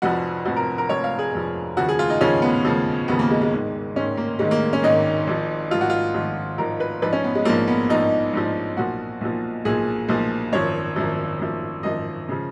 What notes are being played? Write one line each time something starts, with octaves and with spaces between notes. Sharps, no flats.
F1 F2 F3 F#4
F1 F2 F3 F#4
A#4
A#4
F1 F2 F3 C#5
F5
G#4
F1 F2 F3
D#2 C#3 F3 F#4
G#4
F4
D#4
D#2 C#3 F3 C#4
B3
D#2 C#3 F3
D#2 C#3 F3 B3
A#3
G#3
G#3
G#1 G#2 D#3
G#1 G#2 D#3 C#4
A#3
G#1 G#2 D#3 G#3
A#3
C#4
G#1 G#2 D#3 D#4
G#1 G#2 F3
G#1 G#2 F3 F4
F#4
F4
G#1 G#2 F3
G#1 G#2 F3 A#4
B4
A#1 G#2 F3 B4
C#4
B3
G#3
A#1 G#2 F3 A#3
B3
A#1 G#2 F3 D#4
A#1 G#2 F3
B1 A#2 F3 F#4
B1 A#2 F3
B1 A#2 F3 G#4
B1 A#2 F3
G#1 F#2 F3 C#5
G#1 F#2 F3
G#1 F#2 F3
G#1 F#2 F3 D#5
C#3 F3